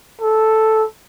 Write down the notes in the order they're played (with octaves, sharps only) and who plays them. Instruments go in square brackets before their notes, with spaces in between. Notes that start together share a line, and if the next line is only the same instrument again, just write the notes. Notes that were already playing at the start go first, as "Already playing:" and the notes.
[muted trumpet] A4